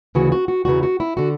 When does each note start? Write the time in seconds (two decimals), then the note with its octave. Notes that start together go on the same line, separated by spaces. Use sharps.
0.15 D2 C#3 E3 F#4
0.32 F#4
0.48 F#4
0.65 E2 C#3 E3 F#4
0.83 F#4
1.00 E4
1.17 D3 F#4